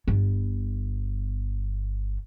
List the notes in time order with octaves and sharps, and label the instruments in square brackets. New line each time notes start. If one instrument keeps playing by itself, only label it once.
[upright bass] G1 B3